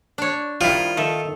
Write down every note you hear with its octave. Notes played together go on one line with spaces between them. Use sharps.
D4 C#5
D#3 F3 G3 E4 F4
D#3 A4 E5